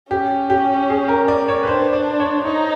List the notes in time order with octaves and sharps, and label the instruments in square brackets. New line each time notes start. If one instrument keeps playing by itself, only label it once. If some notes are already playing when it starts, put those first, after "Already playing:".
[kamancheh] C#4 [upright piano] G4
[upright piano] G4
G#4
A#4
D5
C#5
B4
[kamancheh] D4 [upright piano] C5
[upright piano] D5
C#5
[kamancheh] D#4 [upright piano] C#5